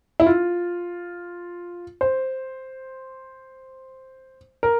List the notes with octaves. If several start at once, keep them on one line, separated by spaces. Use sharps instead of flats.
E4
F4
C5
A#4